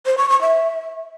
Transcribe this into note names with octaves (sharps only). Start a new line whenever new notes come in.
C5
C#6
C#6
E5